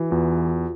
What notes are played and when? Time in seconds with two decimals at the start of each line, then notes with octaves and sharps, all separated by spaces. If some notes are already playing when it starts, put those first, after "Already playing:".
Already playing: E3 F#4
0.11 E2 F4